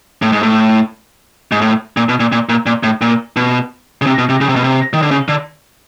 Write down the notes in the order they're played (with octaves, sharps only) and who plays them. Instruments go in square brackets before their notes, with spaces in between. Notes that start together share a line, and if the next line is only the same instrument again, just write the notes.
[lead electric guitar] A2
G#2
A2
G#2
A2
A#2
B2
A#2
A#2
A#2
A#2
A2
A#2
B2
C#3
C3
B2
C3
C#3
C3
B2
C3
D#3
D3
C#3
D3